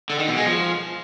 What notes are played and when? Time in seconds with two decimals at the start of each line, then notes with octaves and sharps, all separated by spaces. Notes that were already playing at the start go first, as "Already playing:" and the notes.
0.10 D3
0.19 D#3
0.28 B2
0.37 G#3
0.46 F3